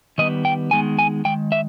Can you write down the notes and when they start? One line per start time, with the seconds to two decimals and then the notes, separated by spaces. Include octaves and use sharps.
0.18 D#3 G3 B3 D#5
0.45 G5
0.71 D#3 G#3 B3 G#5
0.99 G#5
1.25 D#3 G#3 G5
1.52 E5